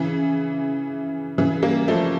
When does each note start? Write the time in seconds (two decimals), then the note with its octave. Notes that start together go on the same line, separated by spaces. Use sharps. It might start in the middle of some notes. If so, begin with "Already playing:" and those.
Already playing: C#3 E3
1.38 C#3 E3
1.62 G3 A#3
1.88 F3 A3